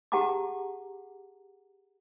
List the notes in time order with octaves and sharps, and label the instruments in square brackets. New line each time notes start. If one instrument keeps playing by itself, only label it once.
[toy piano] G4 G#4 F#5 A5 A#5 D6